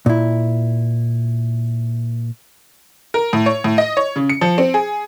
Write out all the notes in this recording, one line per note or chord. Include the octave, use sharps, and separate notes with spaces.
A#2 E4
A#4
A2
C#5
A2
D#5
C#5
C#3
C#7
F3
C4
G#4